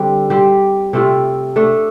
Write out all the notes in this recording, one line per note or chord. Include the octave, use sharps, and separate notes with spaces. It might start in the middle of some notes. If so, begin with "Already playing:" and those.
Already playing: D3 G3 C4
G3 C4 G4
C3 A3 C4 F4
A3 D4 A4